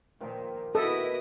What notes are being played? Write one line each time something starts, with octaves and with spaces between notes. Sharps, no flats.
A#2 D#3 F3 G5
B2 E4 F#4 A4 D#5 D#6